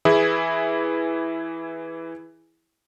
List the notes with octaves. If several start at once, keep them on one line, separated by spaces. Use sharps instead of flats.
E3 E4 G#4